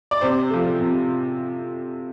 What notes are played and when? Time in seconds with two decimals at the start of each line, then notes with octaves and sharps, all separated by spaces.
0.11 D5
0.21 C3 C5
0.50 F3 A3
0.80 C3